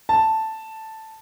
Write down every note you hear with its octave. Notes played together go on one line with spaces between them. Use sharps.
A5